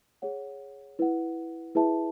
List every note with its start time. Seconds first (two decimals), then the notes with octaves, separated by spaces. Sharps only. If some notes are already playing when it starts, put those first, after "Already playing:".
0.22 G#4 C#5 F#5
0.99 E4 B4 F#5
1.75 E4 G#4 B4 E5 A5